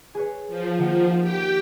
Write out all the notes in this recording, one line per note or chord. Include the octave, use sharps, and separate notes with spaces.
G#4 B4 C#5
F3
D#3 F3 A#3 F#5
G4 G5